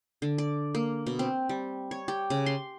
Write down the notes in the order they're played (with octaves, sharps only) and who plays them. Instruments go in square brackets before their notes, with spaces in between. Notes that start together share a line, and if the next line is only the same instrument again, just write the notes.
[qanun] D3
D5
A#3
B2
C4
G3
C#5
G4
C#3
C6